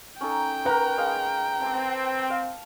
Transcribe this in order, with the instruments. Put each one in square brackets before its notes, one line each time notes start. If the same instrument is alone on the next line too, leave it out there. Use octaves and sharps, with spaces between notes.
[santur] C#4 D#4 A4 [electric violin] G5
[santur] A#4 F#5 [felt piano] B4 A#5
[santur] G#3 F5 D#6
[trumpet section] C4 [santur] A5 D6
[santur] F5